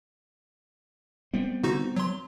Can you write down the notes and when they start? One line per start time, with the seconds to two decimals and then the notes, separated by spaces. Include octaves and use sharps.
1.34 G3 B3 C4
1.64 D3 D#4 F#4
1.96 F#3 C6